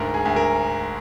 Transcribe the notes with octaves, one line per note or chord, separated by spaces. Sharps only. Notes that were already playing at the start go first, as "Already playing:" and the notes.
Already playing: D2 G#2 A#4
G#4
D2
A#4